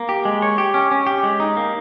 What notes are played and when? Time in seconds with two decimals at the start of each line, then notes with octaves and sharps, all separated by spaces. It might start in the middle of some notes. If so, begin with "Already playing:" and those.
Already playing: A#3
0.09 G4
0.25 G#3
0.42 C#5
0.58 G4
0.74 C#4
0.91 C#4
1.07 G4
1.23 G#3
1.40 D#4
1.57 A#3